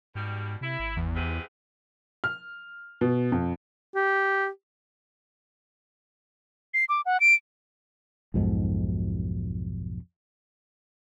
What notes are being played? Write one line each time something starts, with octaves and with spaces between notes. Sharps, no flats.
G#2 B2 G3
C3 E4
G#1
E2
G#2 C3 B4
F6
B2
F2
G4
C7
D6
F#5
D7
B1 F2 G#2 B2